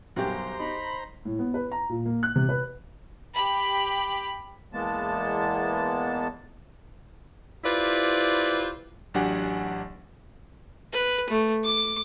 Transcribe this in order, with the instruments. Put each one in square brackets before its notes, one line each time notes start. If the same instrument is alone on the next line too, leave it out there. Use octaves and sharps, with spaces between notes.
[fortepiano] B1 F#2 G3 [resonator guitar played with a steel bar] F#4 G4 [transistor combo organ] C5 A#5
[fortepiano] D#4 [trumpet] B5
[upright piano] A2
B3
B4
A#5
A#2
A#3
F#6
C3
B4
[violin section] G4 B5
[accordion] E2 E3 G#3 A#3 B3 A5
[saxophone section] E4 F4 G4 B4 C5 D5
[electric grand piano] A1 F#3 D4 G4 F#5 G#5
[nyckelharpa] B4
A3
D6